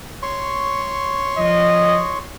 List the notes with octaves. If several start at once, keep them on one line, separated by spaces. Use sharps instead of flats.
C#5 C6 C#6
F3 D#5